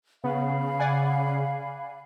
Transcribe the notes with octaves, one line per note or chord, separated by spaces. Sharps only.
C#3 B3 F5 B5
D5 F#5 G#5